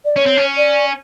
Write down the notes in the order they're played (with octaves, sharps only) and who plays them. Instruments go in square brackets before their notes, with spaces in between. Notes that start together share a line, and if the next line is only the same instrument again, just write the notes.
[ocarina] D5
[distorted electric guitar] C#4 [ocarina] C#5
[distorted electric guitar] C4
C#4
[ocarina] D5